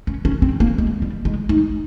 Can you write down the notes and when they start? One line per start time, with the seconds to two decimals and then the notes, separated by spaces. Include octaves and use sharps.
0.07 C#4
0.25 C#4
0.42 C4
0.60 A#3
0.78 G#3
1.02 G3
1.25 G#3
1.49 D#4